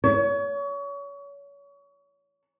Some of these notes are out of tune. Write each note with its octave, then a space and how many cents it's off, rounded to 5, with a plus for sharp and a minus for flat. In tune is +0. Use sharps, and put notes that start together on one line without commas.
C#5 +30